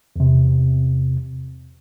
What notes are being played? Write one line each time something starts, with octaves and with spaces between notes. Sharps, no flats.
E2 C3